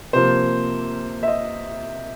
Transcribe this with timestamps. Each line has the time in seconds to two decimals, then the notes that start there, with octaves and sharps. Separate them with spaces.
0.13 C3 F3 A#3 C5
1.23 E5
1.28 D#5